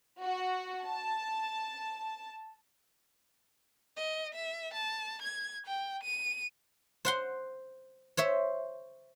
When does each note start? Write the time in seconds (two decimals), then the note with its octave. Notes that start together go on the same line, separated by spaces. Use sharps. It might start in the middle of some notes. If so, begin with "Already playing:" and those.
0.21 F#4
0.85 A5
3.96 D#5
4.34 E5
4.74 A5
5.22 G#6
5.66 G5
6.03 D#7
7.05 C5 F#5 C6
8.17 C5 C#5 E5